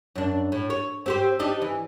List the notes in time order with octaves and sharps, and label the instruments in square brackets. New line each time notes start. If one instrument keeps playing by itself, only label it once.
[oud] F#2 D4
A2
C#5
C4 G4 C5
D4 D#4 G4
E3